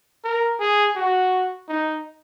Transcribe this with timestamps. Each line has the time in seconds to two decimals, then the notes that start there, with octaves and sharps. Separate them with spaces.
0.24 A#4
0.60 G#4
0.96 F#4
1.68 D#4